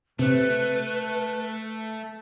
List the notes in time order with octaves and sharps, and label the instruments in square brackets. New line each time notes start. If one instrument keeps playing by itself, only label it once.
[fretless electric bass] C3 [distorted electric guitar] A3 [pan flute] B4